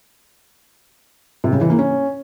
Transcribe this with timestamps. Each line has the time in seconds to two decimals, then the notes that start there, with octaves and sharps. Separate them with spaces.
1.44 C3
1.53 C#3
1.61 E3
1.70 A#3
1.79 C#4